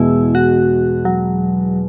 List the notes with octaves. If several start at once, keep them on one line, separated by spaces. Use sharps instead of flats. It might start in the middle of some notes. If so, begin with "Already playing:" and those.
Already playing: E2 B2 G#3 E4
F#4
F#3